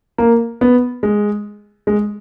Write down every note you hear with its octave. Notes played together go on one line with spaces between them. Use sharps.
A#3
B3
G#3
G#3